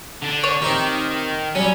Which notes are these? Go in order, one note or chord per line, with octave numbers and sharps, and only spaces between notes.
D3 D4
C#5
D#3 C4 D#4 G4
F#3 G3 C#4